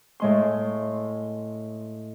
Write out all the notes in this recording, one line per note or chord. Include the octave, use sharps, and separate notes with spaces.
A2 G#3 C6